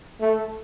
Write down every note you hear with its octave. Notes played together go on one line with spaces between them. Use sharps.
A3